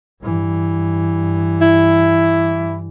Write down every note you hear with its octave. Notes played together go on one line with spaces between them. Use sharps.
G2 E3
E4